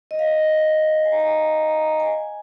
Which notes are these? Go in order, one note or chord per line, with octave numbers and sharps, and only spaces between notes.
D#5
F5
D#5
F5
G#5
A#5
G#5
A#5
G#5